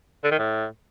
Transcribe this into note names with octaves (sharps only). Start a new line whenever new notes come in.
D3
D#3
A2